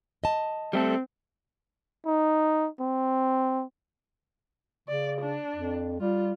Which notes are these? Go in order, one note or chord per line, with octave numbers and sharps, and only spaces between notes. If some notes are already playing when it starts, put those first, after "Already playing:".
D#5 A5
G3 A3 C4 A4
D#4
C4
C#3 D5
D4
F2
G3 F4